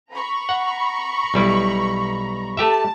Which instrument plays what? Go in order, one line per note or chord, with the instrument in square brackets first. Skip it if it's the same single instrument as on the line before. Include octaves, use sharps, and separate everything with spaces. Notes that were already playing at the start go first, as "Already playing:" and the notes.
[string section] A#5 B5 C#6
[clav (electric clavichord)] F#5
B1 G3 E4
[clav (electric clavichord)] A3 G4 E5 [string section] A5